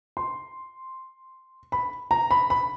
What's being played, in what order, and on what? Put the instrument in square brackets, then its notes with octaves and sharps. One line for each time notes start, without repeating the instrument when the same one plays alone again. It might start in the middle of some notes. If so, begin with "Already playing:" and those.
[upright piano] C6
B5
A#5
B5
B5